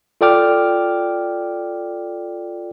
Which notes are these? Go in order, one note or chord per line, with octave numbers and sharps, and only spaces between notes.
F4 A4 D5 G5 D6 F6